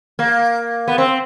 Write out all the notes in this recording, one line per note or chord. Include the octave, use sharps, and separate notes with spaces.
A#3
B3
C4